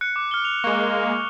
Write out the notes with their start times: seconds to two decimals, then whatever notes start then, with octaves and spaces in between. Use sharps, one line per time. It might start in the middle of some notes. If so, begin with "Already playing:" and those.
0.01 F#6 C#7
0.16 D6
0.31 F6 G7
0.45 F7
0.64 G#3 A#3 C#6